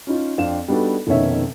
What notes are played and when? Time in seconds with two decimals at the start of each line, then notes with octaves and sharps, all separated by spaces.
0.07 C#4 D#4 F4
0.38 F2 C4 D4 F5 E7
0.68 G3 B3 D4 D#4 F#4 A4
1.07 F1 B2 D#3 C#4 C#5 E5